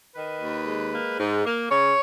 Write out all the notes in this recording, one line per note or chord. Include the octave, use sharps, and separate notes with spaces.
D#3 B4
D#2
G#3
A#3
G#2
A#3
C#3 C#5